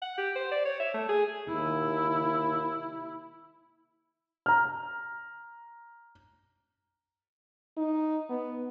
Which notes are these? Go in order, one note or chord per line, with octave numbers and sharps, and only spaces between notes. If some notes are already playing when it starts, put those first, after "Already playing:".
F#5
G4
C5
D5
C#5
E5
A3
G#4
D#2 E4
A#5 F6
D#4
B3